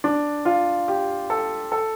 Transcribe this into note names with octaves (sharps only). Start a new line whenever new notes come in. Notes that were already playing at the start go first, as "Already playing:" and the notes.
D4
F4
G4
A4
A4